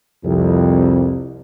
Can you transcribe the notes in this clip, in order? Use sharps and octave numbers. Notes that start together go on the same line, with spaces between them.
C2 F2